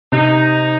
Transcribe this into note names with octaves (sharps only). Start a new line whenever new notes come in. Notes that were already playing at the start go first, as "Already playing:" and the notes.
C3 D#4